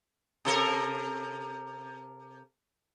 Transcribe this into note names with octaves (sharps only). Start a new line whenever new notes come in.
C3 A4 A#4